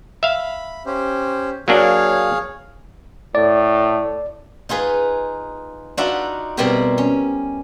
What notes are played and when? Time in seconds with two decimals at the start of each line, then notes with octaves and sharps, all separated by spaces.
0.23 E5 F5 B5
0.86 C#4 G4 C5
1.68 F#3 A#3 D4 G#4 C#5 F5
3.35 A2 D5
4.69 D#4 F4 G#4 B4
5.97 D4 D#4 F4 F#4 E5
6.57 B2 G3 C4 E4 G4 A#4
6.98 C#4